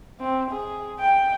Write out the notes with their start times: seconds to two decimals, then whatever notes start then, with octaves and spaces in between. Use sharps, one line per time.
0.20 C4
0.51 G#4
1.00 G5